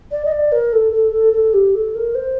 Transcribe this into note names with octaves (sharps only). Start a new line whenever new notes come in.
D5
D#5
D5
A#4
A4
A4
A4
A4
G4
A4
A#4
C5